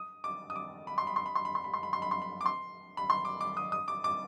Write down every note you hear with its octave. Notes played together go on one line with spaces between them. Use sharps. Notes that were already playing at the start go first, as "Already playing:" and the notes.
Already playing: D#6
D6
D#6
D6
B5
C6
B5
C6
B5
C6
B5
C6
B5
C6
B5
C6
B5
C6
B5
D6
C6
B5
C6
D6
D6
D#6
D#6
D6
D6